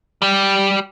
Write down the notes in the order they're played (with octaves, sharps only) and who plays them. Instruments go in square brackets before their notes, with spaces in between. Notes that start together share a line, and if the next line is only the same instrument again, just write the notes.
[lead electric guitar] G3 G4